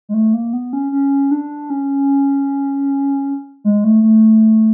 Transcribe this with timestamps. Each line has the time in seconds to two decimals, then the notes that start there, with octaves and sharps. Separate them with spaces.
0.09 G#3
0.14 A3
0.34 A#3
0.53 B3
0.73 C#4
0.92 C#4
1.31 D4
1.70 C#4
3.64 G#3
3.84 A3
4.03 A3